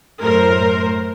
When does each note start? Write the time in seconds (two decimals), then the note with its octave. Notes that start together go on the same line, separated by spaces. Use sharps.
0.22 F#2 A2 A#4 C5